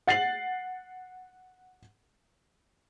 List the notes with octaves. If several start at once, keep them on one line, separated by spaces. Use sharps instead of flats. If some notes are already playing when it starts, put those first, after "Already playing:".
F#5 A6 C7 F#7